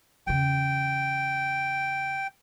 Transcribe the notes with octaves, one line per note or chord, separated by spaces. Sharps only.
E2 C#3 G5